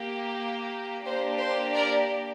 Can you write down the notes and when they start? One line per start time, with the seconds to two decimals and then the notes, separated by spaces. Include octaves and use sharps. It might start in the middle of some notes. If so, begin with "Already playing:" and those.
Already playing: A#3 G4
1.05 A#3 D4 G4 C5
1.39 C5
1.74 A#4 D5